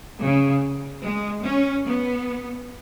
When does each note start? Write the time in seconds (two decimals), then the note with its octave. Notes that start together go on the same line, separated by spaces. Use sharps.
0.20 C#3
1.03 G#3
1.44 C#4
1.86 B3